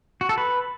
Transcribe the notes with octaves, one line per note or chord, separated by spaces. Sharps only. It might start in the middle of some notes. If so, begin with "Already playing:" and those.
F#4
A4
B4